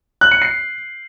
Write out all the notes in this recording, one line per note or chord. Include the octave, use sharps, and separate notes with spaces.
F#6
C#7
C7